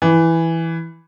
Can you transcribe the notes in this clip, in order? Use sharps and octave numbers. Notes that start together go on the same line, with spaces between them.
E3